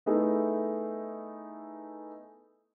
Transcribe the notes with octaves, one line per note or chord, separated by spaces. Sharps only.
A3 B3 D#4 E4 G#4 A4